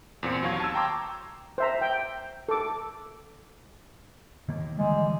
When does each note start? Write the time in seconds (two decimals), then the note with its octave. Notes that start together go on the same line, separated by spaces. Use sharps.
0.23 E2 A#2 C4 C#7
0.43 D#2 F#3 F5 C#6 G#6
0.60 A5 E6
0.75 G5 A#5 C6 D6
1.58 C5 E5 A#5
1.82 G5
2.49 A4 D6
4.49 D#3 A#3
4.79 D3 E3 G3 G#3